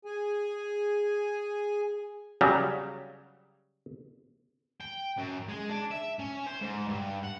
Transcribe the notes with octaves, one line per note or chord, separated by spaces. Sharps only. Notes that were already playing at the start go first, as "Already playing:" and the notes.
G#4 G#5
C#3 F#3 G3
G5
F#2
G#3
D4
E5
C#4
C5
G#2
G2
F#5